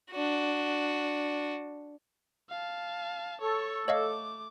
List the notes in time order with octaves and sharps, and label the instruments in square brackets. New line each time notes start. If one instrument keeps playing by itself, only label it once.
[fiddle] D4 F#4
[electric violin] F5 A5
[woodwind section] A4 [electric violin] C#5 C#6
[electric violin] A3 D6 [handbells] C#5 D#5 F5